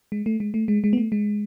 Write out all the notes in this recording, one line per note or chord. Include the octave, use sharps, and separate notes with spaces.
G#3
A3
G#3
A3
G#3
G#3
B3
A3
G#3